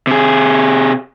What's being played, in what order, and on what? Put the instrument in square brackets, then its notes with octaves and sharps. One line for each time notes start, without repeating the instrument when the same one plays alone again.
[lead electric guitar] C3 G#4